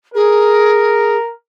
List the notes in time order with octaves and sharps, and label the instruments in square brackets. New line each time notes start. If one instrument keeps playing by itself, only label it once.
[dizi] G#4 [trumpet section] A#4